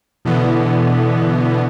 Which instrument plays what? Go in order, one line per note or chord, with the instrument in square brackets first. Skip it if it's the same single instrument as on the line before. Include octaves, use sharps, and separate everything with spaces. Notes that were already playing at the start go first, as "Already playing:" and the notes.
[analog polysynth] B2 D3 E3 B3